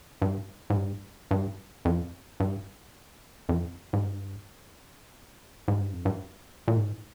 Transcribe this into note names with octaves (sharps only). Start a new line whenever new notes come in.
G2
G#2
G2
G2
F2
G2
F2
G#2
G2
G#2
G2
F2
G2
A#2
G#2